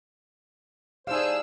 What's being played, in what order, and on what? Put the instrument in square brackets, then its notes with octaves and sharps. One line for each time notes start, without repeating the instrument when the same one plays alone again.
[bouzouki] G3 E4 A4 [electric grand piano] D#4 F5 [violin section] G#4 E6 [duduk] C5